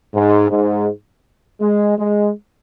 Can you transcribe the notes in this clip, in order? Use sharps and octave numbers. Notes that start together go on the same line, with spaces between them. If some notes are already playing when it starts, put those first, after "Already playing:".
G#2
G#2
G#3
G#3